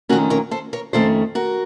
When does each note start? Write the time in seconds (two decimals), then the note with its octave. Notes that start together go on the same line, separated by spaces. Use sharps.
0.09 F2 D#3 A3 C#4 F#4 A#4
0.30 A#4 C#5
0.51 A4 C5
0.73 A#4 C#5
0.93 F2 D#3 A3 C#4 A4 C5
1.35 F#4 A#4